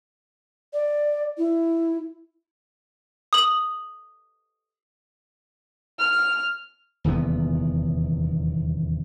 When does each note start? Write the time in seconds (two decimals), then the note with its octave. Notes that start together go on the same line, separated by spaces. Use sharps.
0.73 D5
1.38 E4
3.33 D#6 F#7
5.99 F6
7.04 D#1 E2 C3 B3